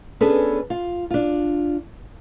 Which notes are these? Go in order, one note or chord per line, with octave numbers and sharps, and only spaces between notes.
B3 C#4 D4 G#4 A4 B4
F4
D4 F4